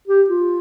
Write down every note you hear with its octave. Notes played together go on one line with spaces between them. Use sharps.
G4
F4